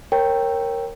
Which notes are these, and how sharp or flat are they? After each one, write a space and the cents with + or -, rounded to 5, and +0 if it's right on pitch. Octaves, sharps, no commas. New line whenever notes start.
A#4 -5 C#5 -25 G5 +0